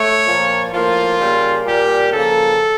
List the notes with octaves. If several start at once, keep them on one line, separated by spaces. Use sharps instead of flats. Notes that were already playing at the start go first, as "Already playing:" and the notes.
Already playing: A3 C#5
A#2 F3 A#3
A2 F3 A#3 F4
C#3 G3 A#3
A#2 G3 A#3 G4
C#3 F3 A#3 A4